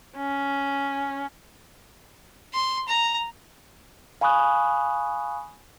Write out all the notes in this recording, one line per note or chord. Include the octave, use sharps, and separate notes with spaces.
C#4
C6
A#5
F5 G#5 B5 C#6 D#6 F#6